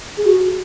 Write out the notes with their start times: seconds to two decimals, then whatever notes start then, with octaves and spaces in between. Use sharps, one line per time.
0.17 G#4
0.26 F#4